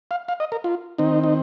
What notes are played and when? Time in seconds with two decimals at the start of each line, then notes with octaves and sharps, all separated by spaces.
0.11 F5
0.28 F5
0.40 D#5
0.52 A#4
0.64 F4
0.98 D#3 C4 D#4
1.24 D#4